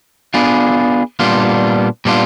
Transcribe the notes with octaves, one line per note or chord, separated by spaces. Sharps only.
B3 D4 F4 G#4
A#2 G3 B3 D4 F4
A#2 G3 B3 D4 F4